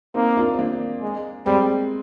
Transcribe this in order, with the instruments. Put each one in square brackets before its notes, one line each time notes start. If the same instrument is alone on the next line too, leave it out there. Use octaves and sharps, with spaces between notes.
[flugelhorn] A#3 [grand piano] C4 D#4
[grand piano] D4 F4
C4
A#3 D4
[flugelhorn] G#3
[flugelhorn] G3 [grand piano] G#3 C4